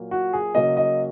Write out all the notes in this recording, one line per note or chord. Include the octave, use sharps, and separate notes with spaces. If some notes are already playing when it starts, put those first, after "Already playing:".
Already playing: A#2 F#3 A#3
F#4
G#4
C#3 F#3 A#3 D#5
D#5